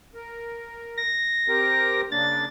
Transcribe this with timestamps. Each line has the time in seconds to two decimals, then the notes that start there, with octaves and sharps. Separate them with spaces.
0.14 A#4
0.97 A#6
1.48 C4 G4 A#4
2.11 C#3 A#3 D4 A6